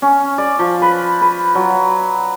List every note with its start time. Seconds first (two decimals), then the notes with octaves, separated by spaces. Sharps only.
0.02 C#4
0.38 D5
0.59 F3
0.82 B4
1.21 B4
1.55 F#3